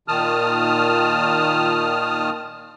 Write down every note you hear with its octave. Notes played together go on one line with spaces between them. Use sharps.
A#2 D#3 A5 D#6 F6